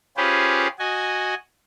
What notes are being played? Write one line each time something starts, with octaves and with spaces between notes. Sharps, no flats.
C#4 F4 G4 G#4 B4 C5
F#4 D#5 G#5